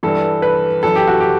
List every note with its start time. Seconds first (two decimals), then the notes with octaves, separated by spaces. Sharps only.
0.03 G2 E3 A4
0.42 B4
0.83 F#2 E3 A4
0.95 G4
1.08 F#4
1.20 G4